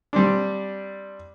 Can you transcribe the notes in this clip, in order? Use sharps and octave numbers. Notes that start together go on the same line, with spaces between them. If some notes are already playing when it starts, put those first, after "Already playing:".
G3 C4 D4